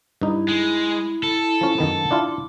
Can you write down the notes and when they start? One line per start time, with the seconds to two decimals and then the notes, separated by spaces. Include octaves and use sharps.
0.21 G2 D#4 E4
0.48 G#3
1.23 A4
1.61 F3 C#4
1.78 F#2 D#3 B3 F#5
2.11 D4 E4 F4 D6